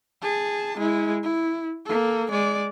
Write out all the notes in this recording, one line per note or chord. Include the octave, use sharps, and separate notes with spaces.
G#4 A5
G#3 E4
E4
A#3 A4
G#3 D5